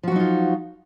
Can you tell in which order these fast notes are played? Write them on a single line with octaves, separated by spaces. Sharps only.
F3 F#4 F#3 D#4 F4